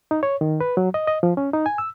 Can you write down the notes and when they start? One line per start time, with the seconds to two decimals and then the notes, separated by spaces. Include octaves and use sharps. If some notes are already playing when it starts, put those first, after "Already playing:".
0.11 D#4
0.23 C#5
0.41 D#3
0.61 B4
0.77 F#3
0.94 D#5
1.07 D#5
1.23 F3
1.37 C#4
1.53 D#4
1.66 G#5
1.78 E6